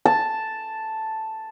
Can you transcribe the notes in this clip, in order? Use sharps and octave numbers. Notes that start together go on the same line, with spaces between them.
A5